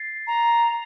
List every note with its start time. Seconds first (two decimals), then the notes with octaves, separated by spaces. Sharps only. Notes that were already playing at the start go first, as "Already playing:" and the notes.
Already playing: A6 C7
0.27 A#5